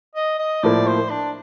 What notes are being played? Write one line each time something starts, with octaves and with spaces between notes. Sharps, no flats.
D#5
D#5
A2 F3 A#3 D5
C5
D4